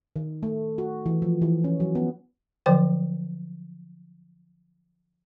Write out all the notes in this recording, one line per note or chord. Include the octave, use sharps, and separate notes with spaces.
D#3
A3
F#4
E3
F3
E3
C#4
F#3
B3
D3 F3 F#3 C5 G5